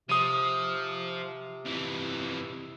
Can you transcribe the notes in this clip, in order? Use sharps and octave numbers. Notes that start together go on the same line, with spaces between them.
C3 F3 D#6 D#7
F2 E3